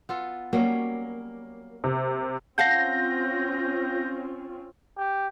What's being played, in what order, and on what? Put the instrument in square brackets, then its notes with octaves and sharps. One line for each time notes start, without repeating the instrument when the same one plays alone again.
[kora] B3 F4 A4
[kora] F#3 G3 C#4 [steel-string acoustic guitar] A#3
[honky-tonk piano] C3
[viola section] C4 C#4 F4 [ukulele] F5 F#5 A5 [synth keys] G6 A#6
[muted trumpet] G4